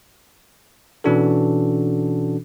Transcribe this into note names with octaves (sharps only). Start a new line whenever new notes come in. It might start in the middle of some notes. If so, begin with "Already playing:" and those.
B2 E3 C#4 D4 F#4 A4